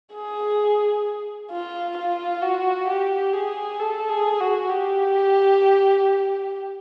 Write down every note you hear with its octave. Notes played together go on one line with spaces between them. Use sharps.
G#4
F4
F4
F#4
G4
G#4
A4
G#4
F#4
G4